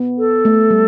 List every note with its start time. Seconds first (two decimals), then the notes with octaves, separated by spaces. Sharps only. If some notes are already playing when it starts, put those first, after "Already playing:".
Already playing: B3
0.18 A4
0.45 A3
0.71 G3